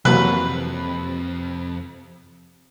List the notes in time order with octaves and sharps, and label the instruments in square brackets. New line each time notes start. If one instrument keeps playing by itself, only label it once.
[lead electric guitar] F2 [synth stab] C3 [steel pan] E3 F#3 A#3 [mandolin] B4